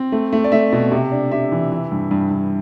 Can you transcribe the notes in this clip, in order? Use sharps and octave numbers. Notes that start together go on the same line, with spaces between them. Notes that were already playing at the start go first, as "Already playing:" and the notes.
Already playing: C4
A3
A3
D5
A3 E5
B2
C3
D4
C3 E5
E3
E3
G2
G2
G2